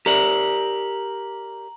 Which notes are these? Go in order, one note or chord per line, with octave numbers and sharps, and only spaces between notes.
G4 A#4 D5 A#5 F#7